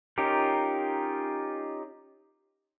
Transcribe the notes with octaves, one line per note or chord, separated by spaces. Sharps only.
C#4 D#4 F4 G4 A#4